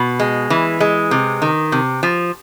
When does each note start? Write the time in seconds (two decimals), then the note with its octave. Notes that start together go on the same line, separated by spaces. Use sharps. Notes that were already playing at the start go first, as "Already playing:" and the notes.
Already playing: B2
0.20 G#3
0.50 E3
0.80 G#3
1.11 C3
1.42 D#3
1.72 C3
2.03 F3